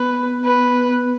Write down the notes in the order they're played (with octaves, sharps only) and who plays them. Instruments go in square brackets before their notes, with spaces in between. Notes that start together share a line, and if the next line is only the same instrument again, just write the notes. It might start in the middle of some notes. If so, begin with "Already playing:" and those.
Already playing: [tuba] B3 [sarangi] B4
[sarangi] B4